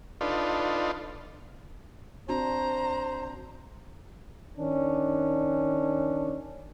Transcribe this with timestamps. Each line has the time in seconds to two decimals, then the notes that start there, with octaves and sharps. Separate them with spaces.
0.21 D4 D#4 F4 A4 B4 C6
2.29 C4 D4 F#4 C5 A#5
4.58 D#3 C#4 D4